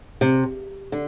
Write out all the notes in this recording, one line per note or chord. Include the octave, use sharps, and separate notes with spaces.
C3
D3